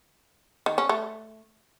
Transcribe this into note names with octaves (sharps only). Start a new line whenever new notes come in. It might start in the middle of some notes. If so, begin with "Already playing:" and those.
D#3
C#4
A3